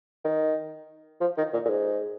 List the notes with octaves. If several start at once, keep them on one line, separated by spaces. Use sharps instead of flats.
D#3
F3
D#3
A#2
A#2
G#2